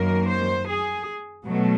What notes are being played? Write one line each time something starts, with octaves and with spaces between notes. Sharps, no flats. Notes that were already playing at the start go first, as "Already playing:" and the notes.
Already playing: F#2 D#3 F#3 A#3 A#4
C5
G#4
B2 F#3 A3